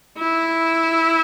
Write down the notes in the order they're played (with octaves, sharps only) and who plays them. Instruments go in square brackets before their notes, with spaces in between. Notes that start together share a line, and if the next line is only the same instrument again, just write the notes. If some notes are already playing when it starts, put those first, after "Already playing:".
[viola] E4